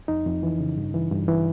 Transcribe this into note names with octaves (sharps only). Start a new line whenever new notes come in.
F2 D#4
F2
E3
C#3
G2
E3
G2
E3